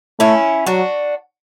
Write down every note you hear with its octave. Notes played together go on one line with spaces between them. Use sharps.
A3 C#4 E4
F#3 D4 F#4